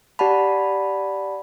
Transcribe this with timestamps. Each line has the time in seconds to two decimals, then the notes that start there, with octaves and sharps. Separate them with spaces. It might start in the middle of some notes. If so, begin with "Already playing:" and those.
0.19 G4 D5 F#5 A5 B5